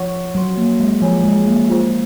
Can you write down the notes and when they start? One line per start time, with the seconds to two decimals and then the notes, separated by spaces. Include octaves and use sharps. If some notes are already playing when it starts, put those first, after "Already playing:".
Already playing: F3 C#5 F#5 C#6
0.35 F#3 C#5 F#5 C6
0.58 A#3
0.80 G#3
1.02 F3 G#4 C#5 G#5
1.24 G#3
1.47 A#3
1.69 F4 G#4 C5